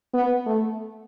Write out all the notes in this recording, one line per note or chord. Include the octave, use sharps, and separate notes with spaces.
B3
A3